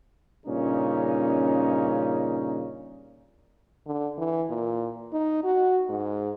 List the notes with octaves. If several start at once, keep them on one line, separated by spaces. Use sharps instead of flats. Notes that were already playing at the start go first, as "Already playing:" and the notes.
G2 A#2 C#3 C#4 D#4
D3
E3
A#2
D#4
F#4
G#2